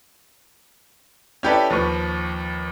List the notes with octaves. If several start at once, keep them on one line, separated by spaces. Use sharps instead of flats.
C#4 E4 G4 A4 B4 D5
D#2 F3 B4 C#6